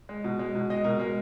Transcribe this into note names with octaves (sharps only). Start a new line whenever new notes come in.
G#3
B2
G#3
B2
G#3 D#5
B2 A#4
G#3 A#4